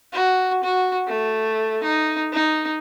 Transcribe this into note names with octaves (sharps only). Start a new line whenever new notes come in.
F#4
F#4
A3
D#4
D#4